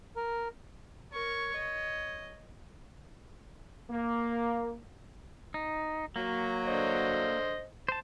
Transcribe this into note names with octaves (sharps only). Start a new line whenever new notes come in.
A#4
A#4 C#5 C#6
D#5
A#3
D#4
F#3 A#3
D3 C5 D#5
C5 A5